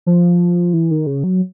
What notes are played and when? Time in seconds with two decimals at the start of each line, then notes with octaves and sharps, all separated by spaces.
0.06 F3
0.73 E3
0.91 D#3
1.07 C#3
1.24 F#3